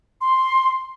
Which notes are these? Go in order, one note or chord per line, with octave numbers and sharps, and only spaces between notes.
C6